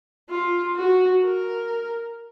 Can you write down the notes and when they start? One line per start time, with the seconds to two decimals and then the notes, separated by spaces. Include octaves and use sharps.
0.30 F4
0.77 F#4
1.23 A#4